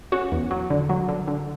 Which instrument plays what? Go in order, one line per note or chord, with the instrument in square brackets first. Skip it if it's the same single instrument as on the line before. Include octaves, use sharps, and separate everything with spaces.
[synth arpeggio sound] C#4 F#4
E2
F#3
D3
F#3
D3
D3